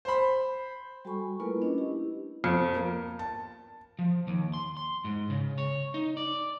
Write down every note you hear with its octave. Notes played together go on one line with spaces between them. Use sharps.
C5 B5
G3 F#4 A4 G#5 B5 C#6
A3 A#3 E4 F4 A#4 B4
C#4 D4 D#5
E4 G4
F2
A#3
A5
F3
D#2
C6
C6
G#2
C#3
C#5
D#4
D5